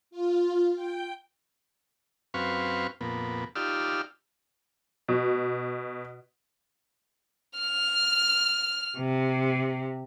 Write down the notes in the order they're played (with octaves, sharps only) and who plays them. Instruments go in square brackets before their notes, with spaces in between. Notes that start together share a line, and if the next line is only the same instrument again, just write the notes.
[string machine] F4
G5
[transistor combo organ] F#2 C4 B4 F5 C#6
F2 A#2 B3
D#4 F4 G4 D5 E6 F6
[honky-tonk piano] B2
[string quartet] F6
C3